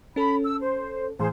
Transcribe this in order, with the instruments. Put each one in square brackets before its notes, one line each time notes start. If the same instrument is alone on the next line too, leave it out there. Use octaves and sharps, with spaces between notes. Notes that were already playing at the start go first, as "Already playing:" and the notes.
[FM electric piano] C#4 A4 [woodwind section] B5
[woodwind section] E6
C5
[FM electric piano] A2 E3 [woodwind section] G#4 C5